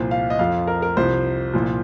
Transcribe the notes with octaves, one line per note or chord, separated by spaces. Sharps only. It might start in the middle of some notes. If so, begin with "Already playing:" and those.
Already playing: C2 A#2 F3 C5
F5
D#5
F2 F3 F5
A#4
A#4
C2 C3 F3 C5
C2 A#2 F3